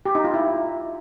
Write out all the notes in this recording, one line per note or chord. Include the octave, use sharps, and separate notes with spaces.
G4
D#4
F4
E4